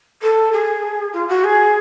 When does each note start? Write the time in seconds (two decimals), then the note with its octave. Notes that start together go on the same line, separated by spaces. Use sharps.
0.22 A4
0.52 G#4
1.13 F4
1.28 F#4
1.44 G#4